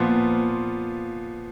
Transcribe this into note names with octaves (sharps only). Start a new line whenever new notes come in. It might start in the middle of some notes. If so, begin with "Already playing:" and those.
Already playing: A#2 F3 B3 F4